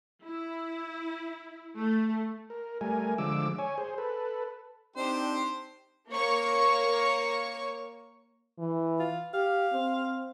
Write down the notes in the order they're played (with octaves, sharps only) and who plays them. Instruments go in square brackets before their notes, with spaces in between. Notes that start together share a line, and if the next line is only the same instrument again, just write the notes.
[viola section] E4
A3
[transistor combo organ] A#4
G3 A3 A#4 G#5
D3 F3 G#3 D6 E6
C#5 G#5
G#4 C5
A4 B4
[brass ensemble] C4 D4 D#4 [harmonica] G4 C5
[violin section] A#3 C#5 C#6
[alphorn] E3
[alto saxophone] F4
[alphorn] G4 [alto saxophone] F5
[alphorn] C4